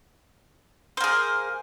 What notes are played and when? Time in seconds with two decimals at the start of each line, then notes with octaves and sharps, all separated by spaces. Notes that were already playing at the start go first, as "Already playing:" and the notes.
0.97 C5
1.01 A#3
1.04 G#4